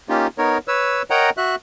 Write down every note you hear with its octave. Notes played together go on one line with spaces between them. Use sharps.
A#3 C#4 D#4 F4 G4
B3 D#4 A#4 C#5
B4 C#5 E6
A#4 C#5 D#5 F#5 G5 A#5
F#4 E5 F#6